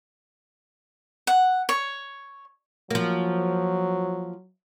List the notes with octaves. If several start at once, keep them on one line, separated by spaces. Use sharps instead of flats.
F#5
C#5
F3 F#3 A#3